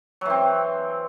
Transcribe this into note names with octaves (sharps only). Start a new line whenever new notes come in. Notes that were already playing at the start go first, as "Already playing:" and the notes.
E3 F#3 C4